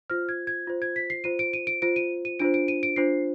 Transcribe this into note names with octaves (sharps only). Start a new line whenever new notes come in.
F4 C5 F6
G#6
G#6
F4 C5
G#6
B6
C7
F4 C5 D#7
D7
D#7
D7
F4 C5 D7
D#7
D#7
D4 F4 C5 D7
D7
D#7
D7
D4 F4 C5 C7